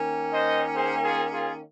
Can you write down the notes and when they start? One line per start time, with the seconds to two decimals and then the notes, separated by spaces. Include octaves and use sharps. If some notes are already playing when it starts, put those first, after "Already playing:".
Already playing: D#3 A#3 C#4
0.32 C5 D#5
0.75 G#4 C5
1.03 F4 G#4
1.32 F4 G#4